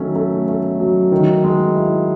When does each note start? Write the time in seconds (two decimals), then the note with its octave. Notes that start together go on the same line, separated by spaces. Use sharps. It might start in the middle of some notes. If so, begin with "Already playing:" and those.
Already playing: D#3 F#3 A3 C#4
0.16 A3
0.49 A3
0.80 F#3
1.12 D#3
1.44 G#3
1.75 E4